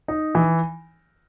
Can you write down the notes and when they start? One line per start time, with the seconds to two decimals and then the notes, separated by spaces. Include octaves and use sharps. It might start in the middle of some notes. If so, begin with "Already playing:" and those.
0.08 D#4
0.35 E3